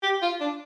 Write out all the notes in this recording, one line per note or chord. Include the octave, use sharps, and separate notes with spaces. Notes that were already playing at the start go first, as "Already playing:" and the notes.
G4
F4
D4